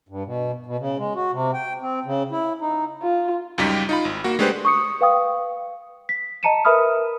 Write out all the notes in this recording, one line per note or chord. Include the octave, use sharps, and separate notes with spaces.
G2
B2
B2
C#3
G#3
F#4
C3
G5
C4
C#3
E4
D#4
F4
C#2 F#2 G3 D#4 G4 B6
D#4 F4 B5
G#1
A#3 F#4
G#3 A3 D4 G4 B4 C5
C#6 D#6 C#7
B4 F5 G5 D#6
B6
D#5 A5 A#5 C#7 D#7 E7
A#4 B4 E5 B5 D#6 F6